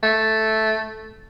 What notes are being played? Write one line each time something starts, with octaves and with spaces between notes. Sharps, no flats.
A3